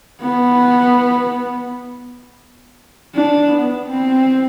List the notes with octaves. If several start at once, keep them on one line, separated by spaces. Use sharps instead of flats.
B3
D4
B3
C4